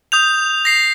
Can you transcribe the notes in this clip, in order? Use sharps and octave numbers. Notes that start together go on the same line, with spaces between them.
D#6 G6 F7
A#6 C7